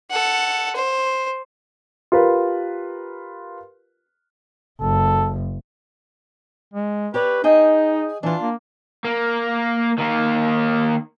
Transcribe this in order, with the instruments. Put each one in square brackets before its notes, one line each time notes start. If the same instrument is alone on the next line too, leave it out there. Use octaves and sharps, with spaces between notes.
[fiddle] A4 F#5
C5
[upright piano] F4 G4 A#4 B4
[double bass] F#1 [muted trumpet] A4
[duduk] G#3
[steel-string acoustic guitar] G4 C#5 D5 [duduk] B4
[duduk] D#4 [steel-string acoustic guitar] G#4 D#5 G5
[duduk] E3 [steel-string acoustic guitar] D4 F4
[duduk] A#3
[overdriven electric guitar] A#3
D#3 A#3